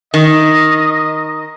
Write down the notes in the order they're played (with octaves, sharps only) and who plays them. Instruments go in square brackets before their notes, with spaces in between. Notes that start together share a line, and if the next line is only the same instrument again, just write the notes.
[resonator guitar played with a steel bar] D#3 [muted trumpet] D#5